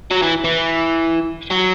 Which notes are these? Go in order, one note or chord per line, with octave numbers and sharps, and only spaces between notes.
F#3
E3
E3
F#3